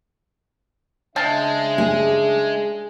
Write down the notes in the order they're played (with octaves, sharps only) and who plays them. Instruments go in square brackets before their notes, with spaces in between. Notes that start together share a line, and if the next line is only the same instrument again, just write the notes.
[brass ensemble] C#3 D4 E5 [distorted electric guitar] G#3 [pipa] F5 G5 A5
[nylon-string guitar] G#4